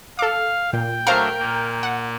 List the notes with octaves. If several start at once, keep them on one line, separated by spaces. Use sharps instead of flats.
A4 F5 D6
A#2 G5
F#3 A3 D4 A#4 C5 F5 A#5
A#2 A#3
F#5